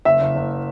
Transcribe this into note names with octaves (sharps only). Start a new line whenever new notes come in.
F#1 E5
F#1
F#1